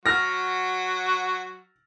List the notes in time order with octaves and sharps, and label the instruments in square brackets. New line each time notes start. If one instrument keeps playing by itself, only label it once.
[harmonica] F#3 F#4 [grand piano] F6 A#6